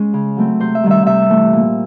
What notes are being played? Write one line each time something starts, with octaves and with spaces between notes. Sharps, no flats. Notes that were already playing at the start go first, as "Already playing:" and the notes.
Already playing: G#3 C#4
C#3
F#3 A3 C4
C3 C5
E5
D#3 G3
E5
C3 E5
E3 A3
A#2